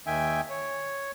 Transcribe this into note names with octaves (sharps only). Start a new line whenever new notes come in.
D#2 D#3 E5 G5 G#5
C#5